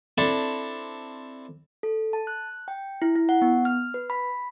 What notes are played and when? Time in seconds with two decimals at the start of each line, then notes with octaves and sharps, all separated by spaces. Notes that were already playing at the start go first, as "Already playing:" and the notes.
0.18 C4 D4 E4 A4
1.83 A4
2.13 A5
2.27 F#6
2.68 G5
3.02 E4
3.16 E4
3.29 F#5
3.42 B3
3.65 F6
3.94 B4
4.10 B5